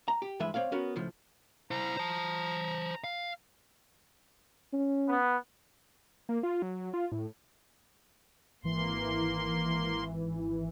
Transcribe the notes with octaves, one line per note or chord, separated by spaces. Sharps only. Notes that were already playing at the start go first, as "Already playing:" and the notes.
A#5
G4
G2 E3 G#3 B4 E5
C4 C#5 D5 F5
B3 C#4 F#4 A#4
C#2 A2 F3
E4 C5 A#5
C5 A5
F5
C#4
B3
A#3
F4
F#3
F4
A2
G#1 E3 A#3 C6